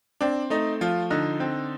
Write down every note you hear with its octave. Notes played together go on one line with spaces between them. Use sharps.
C4 D4
A3 D#4
F3 F4
D3 D#4
C4